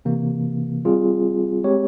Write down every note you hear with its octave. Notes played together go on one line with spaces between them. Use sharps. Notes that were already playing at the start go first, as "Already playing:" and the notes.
C3 E3 A#3
G3 C4 F4 G#4
G#3 C4 G4 C#5